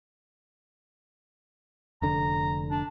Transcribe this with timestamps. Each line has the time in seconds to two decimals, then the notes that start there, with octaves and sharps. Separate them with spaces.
2.02 F1 D3 A#5
2.70 D4